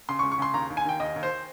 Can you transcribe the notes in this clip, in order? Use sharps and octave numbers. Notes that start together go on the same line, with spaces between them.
C#3 C6
C#6
C#2
C#6
C#3 C6
D#2 A#5
D#2
G#5
D#3 G5
D#2 D#5
D#2
C5